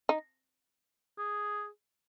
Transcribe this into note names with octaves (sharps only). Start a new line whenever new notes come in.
D#4
G#4